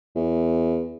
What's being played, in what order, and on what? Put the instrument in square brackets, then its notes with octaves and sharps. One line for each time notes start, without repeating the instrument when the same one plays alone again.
[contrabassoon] E2